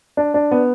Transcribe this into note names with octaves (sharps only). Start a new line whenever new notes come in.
D4
D4
B3